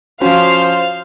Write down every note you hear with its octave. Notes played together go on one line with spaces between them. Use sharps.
F3 C#4 F#4 C5 F5